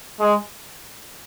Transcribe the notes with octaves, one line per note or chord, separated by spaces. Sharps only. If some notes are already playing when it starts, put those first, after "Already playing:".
G#3